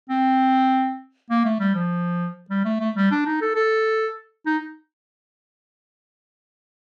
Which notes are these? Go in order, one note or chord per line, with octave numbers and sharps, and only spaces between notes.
C4
A#3
A3
G3
F3
G3
A3
A3
G3
D4
D#4
A4
A4
D#4